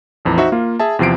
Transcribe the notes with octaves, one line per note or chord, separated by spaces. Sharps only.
A#1 F2 E3 A#5
D#4 F#4 C5 E5
A#3 F4
G#4 E5 A5
E2 C3 F3 C7 D7